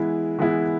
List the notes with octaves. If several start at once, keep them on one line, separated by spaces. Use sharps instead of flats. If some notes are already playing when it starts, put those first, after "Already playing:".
Already playing: E3 G#3 B3 E4 G#4
E3 G#3 B3 E4 G#4